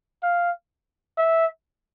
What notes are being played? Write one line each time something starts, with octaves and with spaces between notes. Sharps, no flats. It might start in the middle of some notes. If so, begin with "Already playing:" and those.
F5
E5